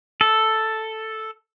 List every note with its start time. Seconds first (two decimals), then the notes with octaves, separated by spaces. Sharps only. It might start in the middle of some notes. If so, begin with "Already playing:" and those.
0.21 A4